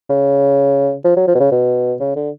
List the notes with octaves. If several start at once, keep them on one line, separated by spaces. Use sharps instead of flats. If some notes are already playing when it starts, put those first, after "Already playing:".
C#3
F3
F#3
F3
B2
C#3
B2
C#3
D3